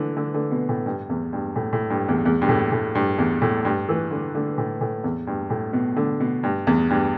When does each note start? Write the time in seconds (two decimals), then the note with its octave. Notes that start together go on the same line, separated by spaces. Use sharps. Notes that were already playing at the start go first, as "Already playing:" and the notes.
Already playing: D3 E3
0.17 D3
0.34 D3
0.51 B2
0.69 A2
0.86 G2
1.10 E2
1.33 G2
1.56 A2
1.73 A2
1.90 G2
2.08 E2
2.25 E2
2.42 G2
2.49 A2
2.72 A2
2.95 G2
3.18 E2
3.42 A2
3.65 G2
3.89 E3
4.11 D3
4.35 D3
4.58 A2
4.81 A2
5.04 E2
5.27 G2
5.50 A2
5.73 B2
5.96 D3
6.20 B2
6.43 G2
6.67 E2
6.90 G2